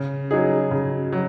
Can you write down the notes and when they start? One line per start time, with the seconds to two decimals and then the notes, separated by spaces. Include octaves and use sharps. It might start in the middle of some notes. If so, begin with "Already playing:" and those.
Already playing: C#3
0.31 F#3 D#4 G#4
0.71 C#3
1.12 F#3